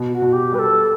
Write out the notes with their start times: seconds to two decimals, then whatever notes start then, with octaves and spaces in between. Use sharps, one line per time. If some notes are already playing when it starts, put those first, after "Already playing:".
Already playing: B2
0.11 F#4
0.22 B2
0.32 G4
0.52 G3 B4
0.58 A4